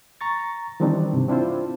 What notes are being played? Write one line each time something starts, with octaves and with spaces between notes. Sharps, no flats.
A#5 C#6 A6
D#3 E3 G3 C4 D4 D#4
G2 C3
C4 D4 E4 F4 C5